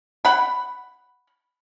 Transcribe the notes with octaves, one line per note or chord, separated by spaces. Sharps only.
F#5 B5